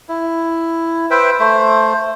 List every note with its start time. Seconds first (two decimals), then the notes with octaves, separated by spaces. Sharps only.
0.09 E4
1.11 B4 C5 E5 G5
1.39 A3 C5